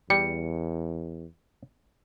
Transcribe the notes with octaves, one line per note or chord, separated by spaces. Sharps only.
E2 G3 C#7